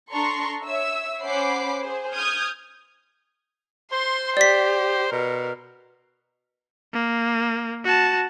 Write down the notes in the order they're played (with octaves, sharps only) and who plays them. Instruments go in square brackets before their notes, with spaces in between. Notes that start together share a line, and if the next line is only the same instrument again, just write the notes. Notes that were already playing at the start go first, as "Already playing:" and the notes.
[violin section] D4 A4 A#5 C6 C#6
C#5 E5 E6
C#4 C5 F#5 B5 D6 C7
G#4 C5
D#6 F6 G6 G#6
[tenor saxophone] C5 [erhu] C6
[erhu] G4 [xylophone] D5 B6
[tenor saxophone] B2 [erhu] A#4
[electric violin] A#3
F#4 A5